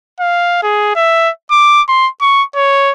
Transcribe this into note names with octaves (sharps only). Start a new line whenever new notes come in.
F5
G#4
E5
D6
C6
C#6
C#5